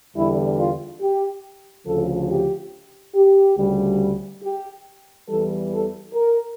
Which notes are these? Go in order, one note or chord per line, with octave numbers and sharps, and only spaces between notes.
E2 D3 G3 E4
F4
G4
D2 C#3 F3 A4
G4
G4
D2 C#3 G3
G4
E2 E3 G3 A4
A4
A#4